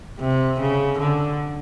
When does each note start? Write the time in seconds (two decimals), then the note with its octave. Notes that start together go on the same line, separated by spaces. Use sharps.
0.20 C3
0.60 C#3
0.99 D3